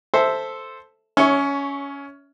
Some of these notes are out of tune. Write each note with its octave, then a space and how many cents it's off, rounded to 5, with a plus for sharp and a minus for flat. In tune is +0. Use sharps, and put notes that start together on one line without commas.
A4 +0 C5 +0 E5 +0
C#4 +15 C#5 +0 E5 -15